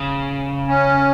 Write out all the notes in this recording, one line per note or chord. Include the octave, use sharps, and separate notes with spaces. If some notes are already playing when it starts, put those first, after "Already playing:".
Already playing: C#3
C#4